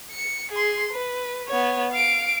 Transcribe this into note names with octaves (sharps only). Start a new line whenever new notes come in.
C#7
G#4 C6
B4
B3 C#5
F5 D7